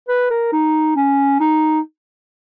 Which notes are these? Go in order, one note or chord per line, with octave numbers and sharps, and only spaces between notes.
B4
A#4
D#4
C#4
D#4